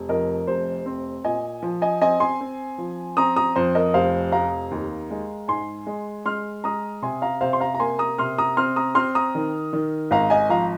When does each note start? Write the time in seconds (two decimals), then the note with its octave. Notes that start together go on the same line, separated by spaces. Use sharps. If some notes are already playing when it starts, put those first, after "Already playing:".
Already playing: F1
0.09 F2 A#4 D#5
0.47 F1 C5
0.86 C4
1.24 A#2 D#5 G#5
1.63 F3
1.82 D#5 G#5
2.01 C4 D#5 G#5
2.20 G#5 C6
2.41 C4
2.78 F3
3.17 C4 A#5 D#6
3.36 A#5 D#6
3.56 F2 C5
3.75 A#4 D#5
3.94 F1 C5 F5
4.32 F1 F5 A#5
4.71 D#2
5.11 G#3
5.48 G#2 G#5 C6
5.87 G#3
6.26 G#3 C6 F6
6.64 G#3 A#5 D#6
7.02 C3 G#5 C6
7.22 F5 A#5
7.41 C3 C5 F5
7.53 C6
7.60 F5 A#5
7.74 A#5
7.80 A#3 G#5 C6
7.99 A#5 D#6
8.18 C3 C6 F6
8.38 A#5 D#6
8.57 C4 C6 F6
8.76 A#5 D#6
8.95 C4 C6 F6
9.15 A#5 D#6
9.35 D#3
9.73 D#3
10.11 G#1 F5 A#5
10.30 D#5 G#5
10.49 F3 F5 A#5